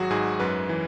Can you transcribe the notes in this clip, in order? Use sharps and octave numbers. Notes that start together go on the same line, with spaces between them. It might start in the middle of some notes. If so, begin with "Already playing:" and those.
Already playing: G#1 F#3 F#4 G#4
G#2 G#4
F#2 B4
E3